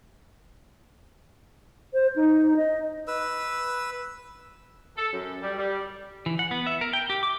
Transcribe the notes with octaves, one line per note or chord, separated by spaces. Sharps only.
C5
D#4
D#5
B4 E6
A4
F#2
G3
G3
E3
F#5
B3
E5
A#4
G5
G4
D6